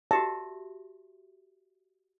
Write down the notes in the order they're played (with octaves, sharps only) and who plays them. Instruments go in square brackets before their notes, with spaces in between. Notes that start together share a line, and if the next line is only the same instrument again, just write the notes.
[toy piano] F#4 G4 E5 [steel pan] A5